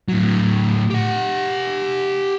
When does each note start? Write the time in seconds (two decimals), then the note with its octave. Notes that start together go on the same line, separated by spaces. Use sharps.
0.08 A2 F#3
0.91 G4 F#5